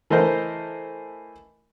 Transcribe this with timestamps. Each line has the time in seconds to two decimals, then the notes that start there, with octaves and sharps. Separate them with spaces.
0.10 E3 A3 A#4 C5 D#5